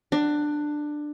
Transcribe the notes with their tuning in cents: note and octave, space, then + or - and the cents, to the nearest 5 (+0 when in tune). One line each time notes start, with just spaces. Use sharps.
D4 +15